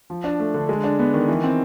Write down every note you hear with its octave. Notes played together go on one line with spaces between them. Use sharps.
F3
D4
A3
D3
G#3
D4
B3
D#3
E3
C4